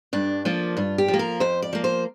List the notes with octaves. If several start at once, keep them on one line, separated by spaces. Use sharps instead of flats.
G2 D4
F3 A#3 D4
G2 F4
G4
F3
A#3
A#4
F2 C5
D5
F3 A#3
C5